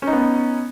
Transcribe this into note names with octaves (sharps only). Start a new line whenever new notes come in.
B3 C#4 D#4